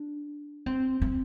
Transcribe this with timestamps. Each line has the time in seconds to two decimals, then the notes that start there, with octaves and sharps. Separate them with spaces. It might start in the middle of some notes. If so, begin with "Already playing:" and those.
Already playing: D4
0.66 C4
1.02 C4